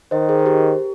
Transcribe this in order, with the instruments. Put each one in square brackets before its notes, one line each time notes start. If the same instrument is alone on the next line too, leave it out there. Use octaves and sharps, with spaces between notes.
[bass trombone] D#3 [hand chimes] C5 D#5
[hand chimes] G#4 C5
C5
G4 A#4